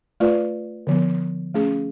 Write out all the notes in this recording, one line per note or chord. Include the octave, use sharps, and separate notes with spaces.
A3 F4 B4 D5
D3 F3 B3
A3 C#4 G#4